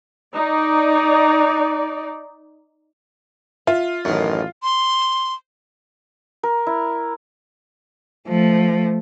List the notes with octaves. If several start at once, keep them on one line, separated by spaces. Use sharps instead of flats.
D#4 D5
F4 E5
A1 F#2 D#3 F#4
C6
A#4
E4
F3 A3